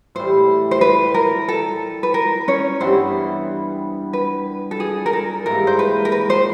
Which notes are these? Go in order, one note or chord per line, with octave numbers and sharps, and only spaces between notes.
A2 E3 G3 C5
C5
B4
A#4
A4
B4
A#4
C#4 C#5
G2 E3 G3 B3 C5
B4
A4
G#4
A#4
A4
G#2 E3 G3 A#3 A#4
C5
B4
A#4
B4
C5